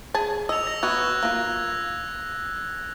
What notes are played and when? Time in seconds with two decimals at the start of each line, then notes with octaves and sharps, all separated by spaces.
0.14 G#4 G#5 A5
0.49 D#5 E6 F7
0.67 A#6
0.83 B3 F#4 F#6 G#6
1.23 A#3 F4